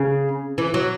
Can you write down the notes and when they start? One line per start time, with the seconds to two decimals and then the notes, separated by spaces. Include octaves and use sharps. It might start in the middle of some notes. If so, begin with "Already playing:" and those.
Already playing: C#3
0.58 E3
0.74 F#3